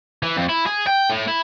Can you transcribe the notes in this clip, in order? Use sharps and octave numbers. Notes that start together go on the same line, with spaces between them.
E3
F2
E4
G#4
G5
A2
E4